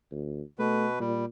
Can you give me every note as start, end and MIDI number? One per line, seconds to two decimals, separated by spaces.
0.12 0.42 38
0.59 0.99 47
0.59 0.86 57
0.59 0.99 71
1.00 1.25 46
1.00 1.25 55